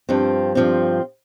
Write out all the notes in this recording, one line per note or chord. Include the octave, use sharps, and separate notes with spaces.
G2 F3 C4
G2 F3 C4